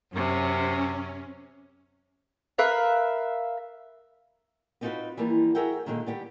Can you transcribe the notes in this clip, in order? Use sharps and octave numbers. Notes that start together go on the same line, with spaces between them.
F#2 C3 C#4
A#4 B4 E5 F5
B3 C4 D#4 F4 F#4 B4
E3 F3 G3 A#3
F#4 G#4 A#4 E5 F#5 G5
A#2 D3 D#3 G#3 A#3
G3 B3 G4